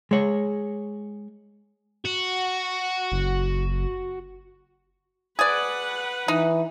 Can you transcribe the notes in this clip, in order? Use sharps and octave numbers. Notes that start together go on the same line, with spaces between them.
G#3 C#5
F#4
F#1
G#4 B4 D5 F#5
E3 D#4